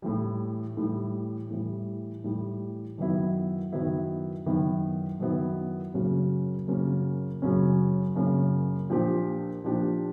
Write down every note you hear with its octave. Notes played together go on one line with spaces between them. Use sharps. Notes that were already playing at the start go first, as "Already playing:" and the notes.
A2 E3 G3
A2 E3 G3
A2 E3 G3
A2 E3 G3
F#2 D#3 F#3 B3 E4
F#2 D#3 F#3 B3 E4
F#2 D#3 F#3 B3 E4
F#2 D#3 F#3 B3 E4
F#2 C#3 F#3 A#3 C#4
F#2 C#3 F#3 A#3 C#4
F#2 C#3 F#3 A#3 C#4
F#2 C#3 F#3 A#3 C#4
A#2 F3 A#3 D4 G4
A#2 F3 A#3 D4 G4